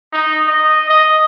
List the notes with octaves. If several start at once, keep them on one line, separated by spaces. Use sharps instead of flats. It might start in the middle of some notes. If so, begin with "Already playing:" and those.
D#4
D#5
D#5